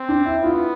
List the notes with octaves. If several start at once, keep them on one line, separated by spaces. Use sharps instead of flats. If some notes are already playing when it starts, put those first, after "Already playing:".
Already playing: C4
D4
E4
B3 F4